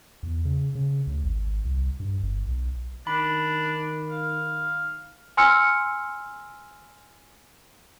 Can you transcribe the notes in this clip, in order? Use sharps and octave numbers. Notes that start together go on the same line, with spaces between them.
E2
C#3
C#3
D2
G#1
C2
G2
G1
B1
D#3 D4 B5
F5
G#5 C6 E6 F6 C#7